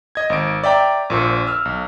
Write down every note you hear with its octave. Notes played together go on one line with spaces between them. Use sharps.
D#5 G#6
G#1 D7
D5 E5 G5 A#5
A#1 A#2 C5
E6 F6
B1